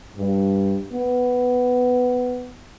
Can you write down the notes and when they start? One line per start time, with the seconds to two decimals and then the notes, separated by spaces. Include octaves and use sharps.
0.16 G2
0.92 B3